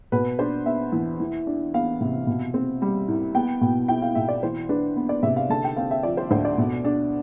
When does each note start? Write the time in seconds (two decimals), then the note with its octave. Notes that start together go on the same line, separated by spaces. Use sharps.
0.12 B2 B4
0.39 D4 C5
0.66 B3 E5
0.92 E2
1.20 E3
1.47 D4
1.74 B3 F5
2.01 C3
2.27 B2
2.54 C4
2.82 G3
3.08 C2
3.35 B3 G5
3.61 B2
3.88 E4 G5
4.02 F5
4.15 B2 E5
4.29 D5
4.43 E3 C5
4.69 D4 B4
4.96 B3
5.09 D5
5.23 C3 E5
5.36 F5
5.49 D3 A5
5.64 G5
5.76 C4 F5
5.91 E5
6.03 F3 D5
6.17 C5
6.31 D2 C5
6.45 D5
6.58 B2
6.84 D4